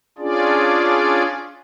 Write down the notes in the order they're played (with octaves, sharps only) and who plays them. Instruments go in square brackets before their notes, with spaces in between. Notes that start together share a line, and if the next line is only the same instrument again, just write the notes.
[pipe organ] C#4 D4 F4 G#4 D5